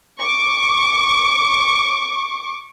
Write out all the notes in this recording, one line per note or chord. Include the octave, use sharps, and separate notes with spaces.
C#6 D6